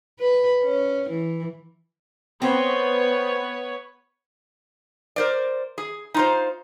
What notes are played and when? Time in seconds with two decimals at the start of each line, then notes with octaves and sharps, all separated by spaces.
0.20 B4
0.63 C#4
1.10 E3
2.42 B3 C4 B4 C#5
5.16 A#4 C5 D5
5.78 G#4
6.14 D#4 F4 C5